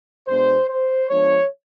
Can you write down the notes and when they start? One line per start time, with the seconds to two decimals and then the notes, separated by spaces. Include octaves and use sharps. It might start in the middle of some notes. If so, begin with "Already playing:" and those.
0.28 B2 G#3 B3 D4 C5
0.69 C5
1.09 F3 G#3 B3 D4 C#5